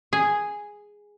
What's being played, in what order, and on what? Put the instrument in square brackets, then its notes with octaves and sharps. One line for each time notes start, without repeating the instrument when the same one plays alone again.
[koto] G#4